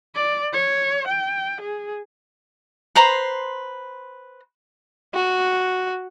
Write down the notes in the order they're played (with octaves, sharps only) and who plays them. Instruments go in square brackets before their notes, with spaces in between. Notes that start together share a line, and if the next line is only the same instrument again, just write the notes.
[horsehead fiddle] D5
C#5
G5
G#4
[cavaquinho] B4 C5 A#5 C6
[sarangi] F#4